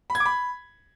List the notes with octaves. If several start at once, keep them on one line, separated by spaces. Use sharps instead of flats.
B5
G#6
D6
B5